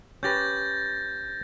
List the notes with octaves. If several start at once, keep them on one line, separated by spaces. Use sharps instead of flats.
C#4 G4 B4 G6 A6 A#6